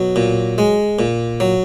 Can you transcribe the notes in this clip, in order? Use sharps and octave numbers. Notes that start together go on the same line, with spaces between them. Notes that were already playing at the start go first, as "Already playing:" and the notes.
Already playing: B2 F#3
A#2
G#3
A#2
F#3